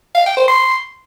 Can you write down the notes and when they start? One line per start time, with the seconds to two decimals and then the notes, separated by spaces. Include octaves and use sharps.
0.15 F5
0.26 G5
0.37 C5
0.48 C6